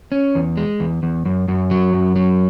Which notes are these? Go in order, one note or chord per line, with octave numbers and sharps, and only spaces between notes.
C#4
E2
G#3
E2
E2
F#2
F#2
F#3
F#2
F#3